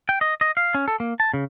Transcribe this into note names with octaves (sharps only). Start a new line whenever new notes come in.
G5
D#5
D#5
F5
C#4
A4
A#3
A5
C#3